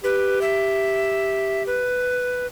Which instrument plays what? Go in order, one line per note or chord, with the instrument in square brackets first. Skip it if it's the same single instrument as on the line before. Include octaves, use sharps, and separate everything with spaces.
[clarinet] G4 [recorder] B4
[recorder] E5
B4